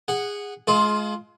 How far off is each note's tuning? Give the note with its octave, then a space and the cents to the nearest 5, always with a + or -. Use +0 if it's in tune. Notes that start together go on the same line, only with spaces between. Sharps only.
G#4 -20 F#5 +0
G#3 +30 F4 +0 G#4 +45